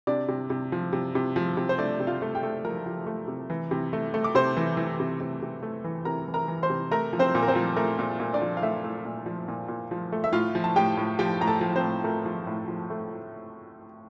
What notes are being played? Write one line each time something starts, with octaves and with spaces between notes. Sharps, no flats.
C3 D4 D5
C3
C3
F3
C3
C3
F3
C3
C5
A3 D4 D5
C3
F4 F5
A3
G4 G5
A3
F3 A#4 A#5
F3
A3
C3
E3
C3
A3
A3
D6
C3 C5 C6
E3
E3
C3
C3
C3
A3
E3
C3 A#4 A#5
E3
A#4 A#5
E3
C5 C6
C3
A3 A#4 A#5
F3
C4 C5
A#2
A#4
C4 C5
F3
A3 A#4
A#2
A#2
D4 D5
F3
F5
A3 E4 E5
A3
A#2
F3
A#2
A#2
F3
A3
E5
A2 F4 F5
F3
A5
A2 G4 G5
A2
F3 G4 G5
A2 A#5
A4 A5
F3
C4 C5
A2
A3 A#4
F3
A2
F3
A3